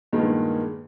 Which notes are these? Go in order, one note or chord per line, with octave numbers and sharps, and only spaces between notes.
G2 A#2 D#3 G#3 A#3 B3